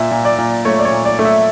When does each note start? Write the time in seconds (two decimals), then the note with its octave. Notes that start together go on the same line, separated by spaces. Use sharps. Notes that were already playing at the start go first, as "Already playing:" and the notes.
Already playing: A#2 E5
0.11 A#2
0.25 D5
0.38 A#2
0.65 A3 C#5
0.79 D5
0.85 C#5
0.92 A#2
1.05 D5
1.19 A3
1.25 E5